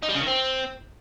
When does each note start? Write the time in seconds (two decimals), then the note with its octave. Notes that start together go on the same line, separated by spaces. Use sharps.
0.03 D#4
0.09 G3
0.15 C#3
0.21 D#3
0.27 C4